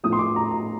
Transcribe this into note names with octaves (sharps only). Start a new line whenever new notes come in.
A2 F3 D#6
C6
D6
A#5
A#5